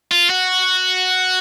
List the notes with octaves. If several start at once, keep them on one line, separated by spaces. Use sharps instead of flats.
F4
F#4